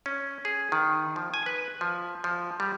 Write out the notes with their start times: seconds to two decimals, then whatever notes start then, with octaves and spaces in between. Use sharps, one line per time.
0.06 C#4
0.45 G#4
0.72 D#3
1.16 F3
1.34 G#5
1.46 B4
1.81 F3
2.24 F3
2.60 G3